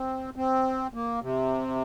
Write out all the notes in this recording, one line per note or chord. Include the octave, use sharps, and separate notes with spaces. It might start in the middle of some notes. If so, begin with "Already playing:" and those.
Already playing: C4
C4
A#3
C3